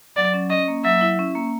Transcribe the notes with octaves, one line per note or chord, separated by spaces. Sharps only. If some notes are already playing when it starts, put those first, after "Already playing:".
F#3 D5
C#4
C#4 D#5
A#3
F#3 E5
E4
C#4
A#3